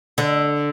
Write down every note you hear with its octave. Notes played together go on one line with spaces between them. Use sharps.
D3